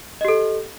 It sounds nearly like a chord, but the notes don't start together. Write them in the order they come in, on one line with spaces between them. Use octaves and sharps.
D#5 G4 A4